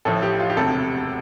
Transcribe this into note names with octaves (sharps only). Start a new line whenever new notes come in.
A1 A2 F3 A4
G4
F4
G4
E1 D2 C3 A4